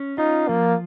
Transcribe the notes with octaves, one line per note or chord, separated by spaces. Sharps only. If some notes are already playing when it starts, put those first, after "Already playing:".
Already playing: C#4
D#4 F4
F3 A#3